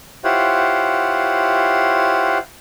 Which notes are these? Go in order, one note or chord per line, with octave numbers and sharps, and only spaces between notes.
E4 F4 G4 C5 C#5 F#5